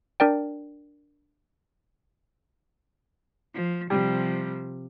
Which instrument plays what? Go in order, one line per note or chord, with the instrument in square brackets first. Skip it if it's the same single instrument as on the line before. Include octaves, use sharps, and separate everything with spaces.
[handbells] D4 A#4 D5 G5
[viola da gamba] F3
[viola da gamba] C3 F3 [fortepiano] G3